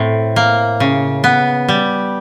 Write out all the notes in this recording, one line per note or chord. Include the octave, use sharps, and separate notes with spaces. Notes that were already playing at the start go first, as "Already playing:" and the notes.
Already playing: A2 C4
A#3
C#3
B3
G3